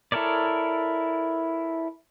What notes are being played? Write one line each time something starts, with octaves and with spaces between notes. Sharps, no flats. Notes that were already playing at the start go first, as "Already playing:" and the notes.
E4 A4 A#4 C#5 D5